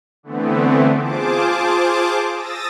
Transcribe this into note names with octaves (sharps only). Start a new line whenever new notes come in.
D3 E3 A3 B3 C4
F4 G#4 C5 A5 D6
D#6 E6 A6 A#6